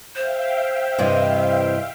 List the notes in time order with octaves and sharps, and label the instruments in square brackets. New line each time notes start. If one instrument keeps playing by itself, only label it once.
[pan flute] C5 [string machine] E5 F5 G5
[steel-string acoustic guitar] G2 D#5 [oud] C3 E3 C4